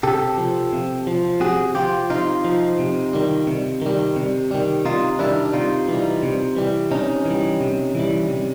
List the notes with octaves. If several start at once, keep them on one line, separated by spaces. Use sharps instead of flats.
C3 G4 A4
F3
C3
F3
C3 F#4 G#4
F3 F4 G4
C3 D#4 F4
F3
C3
D#3 G3
C3
D#3 G3
C3
D#3 G3
C3 D#4 F4
D#3 G3 D4 E4
C3 D#4 F4
E3 G3
C3
E3 G3
C3 C#4 D#4
E3 G3
C3
E3 G3
C3